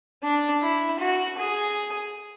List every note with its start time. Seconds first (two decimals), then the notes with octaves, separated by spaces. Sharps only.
0.23 D4
0.62 E4
0.99 F#4
1.38 G#4